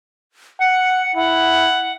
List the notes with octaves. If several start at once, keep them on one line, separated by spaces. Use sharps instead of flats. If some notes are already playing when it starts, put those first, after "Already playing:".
F#5 C#7
E4 F#5